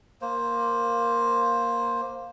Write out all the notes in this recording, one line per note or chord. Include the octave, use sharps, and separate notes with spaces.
A#3 C5